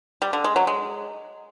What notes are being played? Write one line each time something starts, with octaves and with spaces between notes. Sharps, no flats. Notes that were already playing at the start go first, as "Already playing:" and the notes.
G3
D3
G#3
F#3
G#3